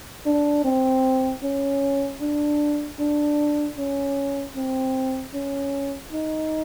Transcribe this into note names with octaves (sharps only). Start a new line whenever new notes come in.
D4
C4
C#4
D4
D4
C#4
C4
C#4
D#4